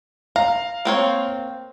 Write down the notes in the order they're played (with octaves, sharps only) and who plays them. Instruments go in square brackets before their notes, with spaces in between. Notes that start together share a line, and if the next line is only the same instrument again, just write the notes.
[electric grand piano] F5 [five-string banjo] A#5
[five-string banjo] A#3 C4 C#5